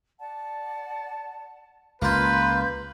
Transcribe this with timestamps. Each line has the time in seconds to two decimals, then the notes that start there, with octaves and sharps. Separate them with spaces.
0.19 D5 F#5 A5
2.02 C#2 A#3 F4 B4 C6 G6